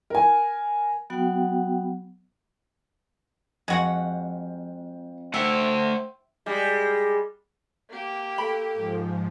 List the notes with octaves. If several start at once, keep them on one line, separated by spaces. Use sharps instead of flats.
A#4 G#5
F#3 B3 F#4 F#5 G5
F2 G#3 F#4 F#5
A3 C5 E5 F#5 G5
G3 G#3
A#3 G4
A4 B5
G#2 F3